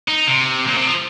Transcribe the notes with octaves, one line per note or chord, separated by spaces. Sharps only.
D#4
C3
A#2
C3
F3